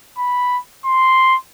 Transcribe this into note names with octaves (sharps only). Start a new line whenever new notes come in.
B5
C6